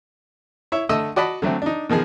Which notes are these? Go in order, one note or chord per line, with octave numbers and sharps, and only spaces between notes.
E4 C#5 E5
D3 A3 D#5 D#6 E6
F#4 D5 D#5 A5 B5
D3 F#3 A3 C4
D4 D#4
B2 D#3 F3 G#4